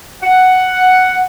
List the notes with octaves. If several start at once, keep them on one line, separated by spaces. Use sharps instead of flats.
F#5